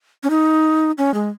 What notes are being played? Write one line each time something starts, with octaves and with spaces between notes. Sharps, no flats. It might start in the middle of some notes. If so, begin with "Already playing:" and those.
C#4
D#4
C#4
G#3